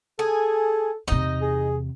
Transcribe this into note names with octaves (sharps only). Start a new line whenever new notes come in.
G#4 A4
E2 C3 D#4 D#5
G#4